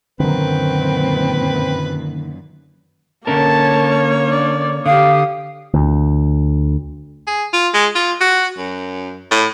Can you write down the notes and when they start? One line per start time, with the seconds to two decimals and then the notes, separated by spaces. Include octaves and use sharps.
0.20 F#2 A#2 D3 D#3 C4 B4
3.27 D3 A#3 C#4 A#4 C#5 A5
4.27 D4 D5
4.86 D3 G4 F5 D#6
5.74 D2
7.27 G#4
7.53 F4
7.74 G#3
7.95 F4
8.21 F#4
8.58 F#2
9.31 A2